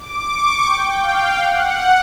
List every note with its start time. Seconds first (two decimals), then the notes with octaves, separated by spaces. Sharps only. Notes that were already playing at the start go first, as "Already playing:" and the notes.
Already playing: D6
0.30 C#6
0.65 G5
1.01 F5
1.37 F#5